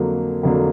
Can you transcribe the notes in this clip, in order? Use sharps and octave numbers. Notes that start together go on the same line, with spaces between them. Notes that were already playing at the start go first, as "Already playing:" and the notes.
Already playing: F2 D3 F#3 A#3
F2 D3 F#3 A#3